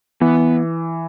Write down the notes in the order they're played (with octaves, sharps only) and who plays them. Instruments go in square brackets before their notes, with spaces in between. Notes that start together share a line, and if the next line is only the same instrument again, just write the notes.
[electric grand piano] E3 [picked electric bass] B3